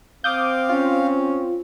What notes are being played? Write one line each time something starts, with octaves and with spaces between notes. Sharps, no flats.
C4 F5 D6 D#6 G6
C#4 F4